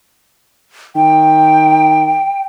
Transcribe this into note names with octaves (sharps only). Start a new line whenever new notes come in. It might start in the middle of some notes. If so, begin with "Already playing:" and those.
D#3 G5